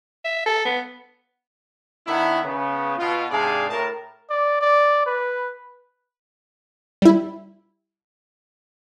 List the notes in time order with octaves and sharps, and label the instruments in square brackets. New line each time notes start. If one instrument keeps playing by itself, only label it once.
[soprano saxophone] E5
A4
B3
[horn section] D#3 B3 D4 E4
C#3 B3
B2 F4
G#2 C3 D4 G#4 D5 F5
A2 A#4 A5
[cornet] D5
D5
B4
[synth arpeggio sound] G3 E4